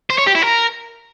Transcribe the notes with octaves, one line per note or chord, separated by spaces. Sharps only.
C5
C#5
G4
E4
A#4